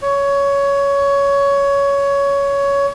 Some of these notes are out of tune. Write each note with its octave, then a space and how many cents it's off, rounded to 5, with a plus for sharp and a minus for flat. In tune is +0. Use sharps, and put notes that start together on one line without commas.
C#5 +15